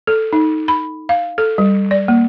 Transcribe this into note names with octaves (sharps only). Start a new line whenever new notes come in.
A4
D#4
B5
F5
A4
G3
D5
A#3